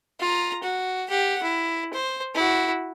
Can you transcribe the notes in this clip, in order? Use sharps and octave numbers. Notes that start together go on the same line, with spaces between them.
F4 A#5
F#4
G4 F#5
E4
C5
E4 F#4